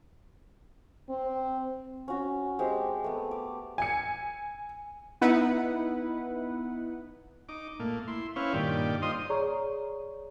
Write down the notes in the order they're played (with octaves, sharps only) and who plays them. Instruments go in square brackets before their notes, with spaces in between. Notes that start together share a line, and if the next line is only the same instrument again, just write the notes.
[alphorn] C4
[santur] C#4 F#4
G#3 C4 G4
A3 B3
D6
[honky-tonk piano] G#5 C#7
[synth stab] B3 D#4 E4 B4 F#5
[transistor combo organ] D#4 D6
A#2 A3 A#3
E4 C6
C4 C#4 E4 B4 C#5 F5
G2 A#2 D#3 G4 D5
D#4 F4 C5 D#5 C6 D#6
[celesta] G#4 C#5 D5 A#5 C#6